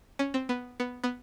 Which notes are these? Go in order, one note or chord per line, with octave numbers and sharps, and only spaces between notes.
C#4
C4
B3
B3
B3